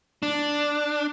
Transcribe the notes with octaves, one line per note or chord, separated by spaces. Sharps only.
D4